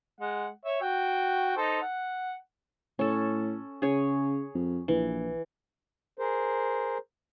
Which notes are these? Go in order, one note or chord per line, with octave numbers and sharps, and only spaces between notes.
G#3 F#5
C#5 E5
F#4 G5
D#4 A4 C5
F#5
A2 C#4 A4
C#3 G#4 C#5
F2
A#1 E3
G#4 A#4 C5